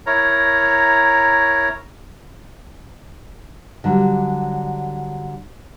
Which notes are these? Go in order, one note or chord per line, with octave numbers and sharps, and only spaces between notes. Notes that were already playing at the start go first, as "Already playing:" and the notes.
E4 A#4 C#5 A#5
D3 F#3 G3